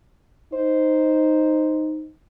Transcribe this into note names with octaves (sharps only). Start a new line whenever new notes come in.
D#4 C5